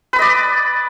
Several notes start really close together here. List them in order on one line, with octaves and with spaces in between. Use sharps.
B4 B5 D#5 D5